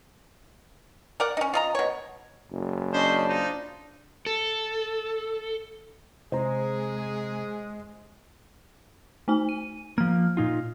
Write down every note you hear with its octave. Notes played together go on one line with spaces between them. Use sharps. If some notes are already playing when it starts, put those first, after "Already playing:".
A#4 D5 F#5
C#4 D#4
F4 D#5 A#5
B2 C#5
F#1
C#4 D4 C5 D#5 B5
D#4 F4 C5
A4
C3 G#3 C4 G#4 C5 A#5
A3 D#4 G#5
D#7
F3 A#3 F6
A#2 D#4 F4